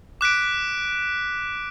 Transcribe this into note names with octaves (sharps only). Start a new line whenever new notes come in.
D6 F#6 B6 D7